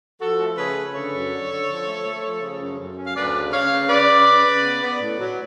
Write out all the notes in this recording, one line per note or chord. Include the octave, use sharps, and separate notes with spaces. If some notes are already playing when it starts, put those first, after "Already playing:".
F3 F#4 A4
A3
C#3 G#4 B4
C#3
D3 A4 C#5
F#2
D3
D3
F3
A3
A3
F3
C#3
F#2
F#2
C#4
F5
D2 B4 D5
C#3
C#3 C#5 F5
C#3
C#3 B4 D5
C#3
C#3
C#3
B3
B3
A2
F#3